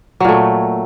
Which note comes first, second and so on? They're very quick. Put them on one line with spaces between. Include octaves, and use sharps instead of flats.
F#3 A#2 A3